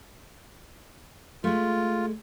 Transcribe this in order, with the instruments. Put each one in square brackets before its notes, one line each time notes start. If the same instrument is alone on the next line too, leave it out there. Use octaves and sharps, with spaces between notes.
[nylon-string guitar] G#3 A3 [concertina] F4